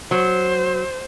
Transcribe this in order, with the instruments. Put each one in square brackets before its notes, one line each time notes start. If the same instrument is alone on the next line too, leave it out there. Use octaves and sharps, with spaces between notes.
[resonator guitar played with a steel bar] F#3 [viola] C5